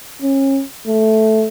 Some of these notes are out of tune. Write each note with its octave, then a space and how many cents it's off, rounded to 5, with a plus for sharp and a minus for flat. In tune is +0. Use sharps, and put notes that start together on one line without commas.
C#4 -30
A3 -5